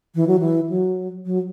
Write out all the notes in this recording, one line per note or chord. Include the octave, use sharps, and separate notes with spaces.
E3
F#3
E3
F#3
F#3